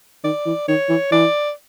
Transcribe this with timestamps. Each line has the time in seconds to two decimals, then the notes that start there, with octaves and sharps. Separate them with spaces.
0.24 D#3 D5
0.46 E3
0.68 D#3 C#5
0.89 E3
1.12 E3 D5